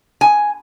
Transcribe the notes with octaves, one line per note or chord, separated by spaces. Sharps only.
G#5